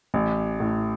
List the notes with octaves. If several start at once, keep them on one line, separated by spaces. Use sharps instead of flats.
A1
A2